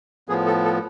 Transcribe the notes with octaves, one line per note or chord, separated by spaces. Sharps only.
A2 F3 B3 G#4
A4
A4